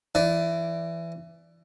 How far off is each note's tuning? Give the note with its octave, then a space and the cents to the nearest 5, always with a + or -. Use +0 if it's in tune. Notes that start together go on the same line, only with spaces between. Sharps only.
E3 +20 D5 +0